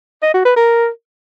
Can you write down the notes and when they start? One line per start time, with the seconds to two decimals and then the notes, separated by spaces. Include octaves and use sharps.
0.23 D#5
0.34 F#4
0.45 B4
0.56 A#4